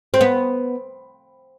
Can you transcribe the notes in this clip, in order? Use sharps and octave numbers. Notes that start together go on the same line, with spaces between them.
C4
B3